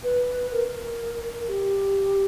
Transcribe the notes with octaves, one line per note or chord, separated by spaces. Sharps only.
B4
A#4
G4